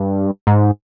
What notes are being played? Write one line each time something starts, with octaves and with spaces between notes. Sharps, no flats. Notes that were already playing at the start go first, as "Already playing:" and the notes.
Already playing: G2
G#2